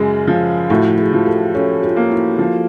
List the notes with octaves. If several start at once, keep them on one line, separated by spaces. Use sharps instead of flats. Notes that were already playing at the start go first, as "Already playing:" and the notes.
Already playing: F#2 C#3 G#3 F#4
F3
A2 E4 F#4
F#4 G#4
F3
G4 A4
C#4 G4 A4
F4 G4
A#3
E4 F#4
F3